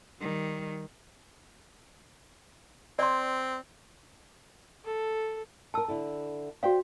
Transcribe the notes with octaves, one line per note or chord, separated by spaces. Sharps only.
D#3 G3
C4 D5 C6
A4
A4 A#4 A5 E6
D3 E4 A4
F#4 C5 D5 F5 G5